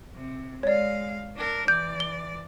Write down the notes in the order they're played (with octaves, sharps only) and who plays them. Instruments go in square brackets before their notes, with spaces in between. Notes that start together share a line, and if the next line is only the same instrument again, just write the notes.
[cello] C3
[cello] G#3 F5 [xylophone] C#5 D5
[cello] D4 A#4
[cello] E3 D5 [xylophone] G6
[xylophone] G7